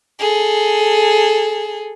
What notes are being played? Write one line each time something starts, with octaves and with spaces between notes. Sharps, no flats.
G#4 A4